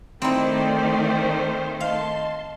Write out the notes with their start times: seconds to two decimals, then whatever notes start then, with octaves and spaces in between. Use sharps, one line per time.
0.22 D#3 A3 C4 D#4 E4 C5 D5 G5
1.81 D#5 F5 A5 C6